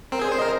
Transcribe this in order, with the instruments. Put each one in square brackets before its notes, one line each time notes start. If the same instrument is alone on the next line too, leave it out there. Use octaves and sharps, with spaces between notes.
[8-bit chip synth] C4 [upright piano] A#4
[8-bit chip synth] G#4 [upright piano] C5
[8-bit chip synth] C5
[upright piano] D#5
[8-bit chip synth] A#4